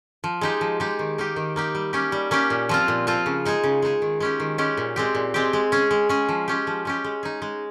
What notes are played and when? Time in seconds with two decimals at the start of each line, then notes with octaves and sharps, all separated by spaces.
0.24 F3
0.41 G#3 D#4 G4
0.61 F3
0.80 G#3 D#4 G4
0.99 D#3
1.18 A#3 D#4 G4
1.36 D#3
1.56 A#3 D#4 G4
1.75 G3
1.93 A#3 C#4 G4
2.12 G3
2.31 A#3 C#4 G4
2.50 A#2
2.69 F3 C4 F4
2.88 A#2
3.07 F3 C4 F4
3.26 C#3
3.45 G#3 D#4 G#4
3.64 C#3
3.82 G#3 D#4 G#4
4.02 D#3
4.20 G#3 C#4 G4
4.40 D#3
4.58 G#3 C#4 G4
4.77 A#2
4.96 G#3 C4 G4
5.15 A#2
5.34 G#3 C4 G4
5.53 G#3
5.72 C#4 G#4
5.91 G#3
6.09 C#4 G#4
6.29 F3
6.48 G#3 C#4 G4
6.67 F3
6.85 G#3 C#4 G4
7.04 G#3
7.23 D#4 G#4
7.42 G#3